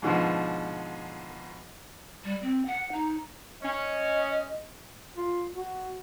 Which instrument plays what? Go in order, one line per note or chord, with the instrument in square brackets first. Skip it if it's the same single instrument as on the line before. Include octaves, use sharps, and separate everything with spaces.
[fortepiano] G#2 B2 D3 F3
[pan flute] G3
C4
F#5
D#4
[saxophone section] C#4 [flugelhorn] D#5
[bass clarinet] F4
F#4